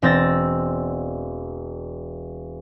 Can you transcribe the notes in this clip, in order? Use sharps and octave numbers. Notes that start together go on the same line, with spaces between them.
E1 C4 E6 A6 A#6